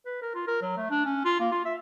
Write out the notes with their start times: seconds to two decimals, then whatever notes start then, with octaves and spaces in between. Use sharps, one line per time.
0.06 B4
0.22 A#4
0.34 F4
0.47 A#4
0.62 F#3
0.77 A3
0.90 D4
1.05 C#4
1.25 F4
1.40 A#3
1.52 F4
1.65 E5